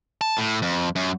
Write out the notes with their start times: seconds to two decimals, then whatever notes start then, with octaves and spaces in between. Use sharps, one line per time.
0.21 A5
0.38 A2
0.62 F2
0.96 F#2